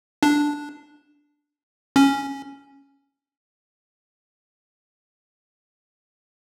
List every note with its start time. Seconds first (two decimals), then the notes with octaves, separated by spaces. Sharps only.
0.23 D4
1.96 C#4